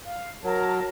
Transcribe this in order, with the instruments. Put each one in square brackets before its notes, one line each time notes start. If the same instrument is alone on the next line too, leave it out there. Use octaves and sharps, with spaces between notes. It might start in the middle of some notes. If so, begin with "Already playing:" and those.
[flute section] F5
[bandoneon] F#3 [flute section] A#4 A5